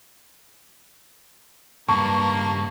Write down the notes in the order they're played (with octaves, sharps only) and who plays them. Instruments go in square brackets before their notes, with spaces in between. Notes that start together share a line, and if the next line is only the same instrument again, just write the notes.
[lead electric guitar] C#2 G2 [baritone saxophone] A#3 [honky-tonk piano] A5 C#6